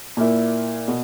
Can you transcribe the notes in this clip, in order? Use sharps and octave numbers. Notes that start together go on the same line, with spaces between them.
A#2 A#3 E4
B2